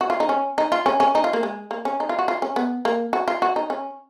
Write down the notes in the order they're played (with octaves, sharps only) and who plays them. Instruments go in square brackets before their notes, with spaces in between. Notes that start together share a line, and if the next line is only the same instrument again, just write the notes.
[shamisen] F#4
F4
D#4
C#4
D#4
F4
C#4
C#4
D#4
F4
A#3
G#3
A#3
C#4
D#4
F4
F#4
F4
C#4
B3
A#3
F#4
F4
F#4
D#4
C#4